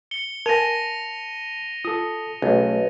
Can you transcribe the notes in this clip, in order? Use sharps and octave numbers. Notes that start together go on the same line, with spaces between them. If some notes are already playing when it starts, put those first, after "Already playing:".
C#7 G7
A#4 G#5 A5 A#6 D#7 F7
F4 A4 D#6
B1 A3 C#4 G#4